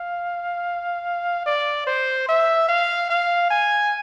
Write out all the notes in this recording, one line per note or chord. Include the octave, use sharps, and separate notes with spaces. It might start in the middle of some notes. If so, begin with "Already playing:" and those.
Already playing: F5
D5
C5
E5
F5
F5
G#5